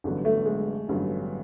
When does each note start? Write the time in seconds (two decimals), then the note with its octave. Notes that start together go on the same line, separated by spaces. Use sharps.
0.04 A1 G2 D3 F#3 B3
0.25 A3
0.45 G#3
0.88 A1 G2 D3 F#3 B3